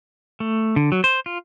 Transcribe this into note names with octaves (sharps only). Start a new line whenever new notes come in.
A3
D3
F#3
C5
F4